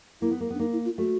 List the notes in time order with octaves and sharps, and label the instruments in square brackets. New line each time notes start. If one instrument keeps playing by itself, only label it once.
[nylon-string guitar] A#3 [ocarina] E4
[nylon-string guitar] B3
A#3
B3
[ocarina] D4
[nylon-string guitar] A#3 [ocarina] D#4
[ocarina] E4
F4
[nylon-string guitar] A3 [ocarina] F#4